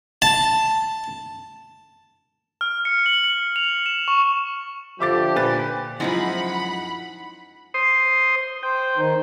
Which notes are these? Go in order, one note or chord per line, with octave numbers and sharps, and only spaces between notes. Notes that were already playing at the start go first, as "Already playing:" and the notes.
A5
F6
C#7
F#7
C#7
F7
E7
C#6
D3 F3 G4 E5 D6 A6
A#2 B4 A6
F#2 F3 G#3 D#4 E4 F#5 B5
C5 C6 D#6
C5 G5
D#3 D#4